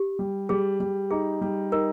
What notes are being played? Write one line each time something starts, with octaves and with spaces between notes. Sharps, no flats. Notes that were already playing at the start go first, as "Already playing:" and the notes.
Already playing: G4
G3
G3 G#4
G3
D#4 G#4
G3
D#4 A#4